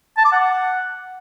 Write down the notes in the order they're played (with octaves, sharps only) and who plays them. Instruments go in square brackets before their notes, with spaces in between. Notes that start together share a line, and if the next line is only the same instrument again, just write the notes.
[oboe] A5
D6
F#5